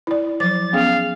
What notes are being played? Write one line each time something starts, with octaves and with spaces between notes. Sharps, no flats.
E4 D5
F3 F#3 D6 A6
B3 C#4 G#4 F5